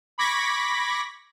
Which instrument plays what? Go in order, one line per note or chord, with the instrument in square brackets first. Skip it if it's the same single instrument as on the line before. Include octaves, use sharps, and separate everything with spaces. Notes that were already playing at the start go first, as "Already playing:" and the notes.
[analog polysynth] B5 C#6 D6 G#6 A#6 B6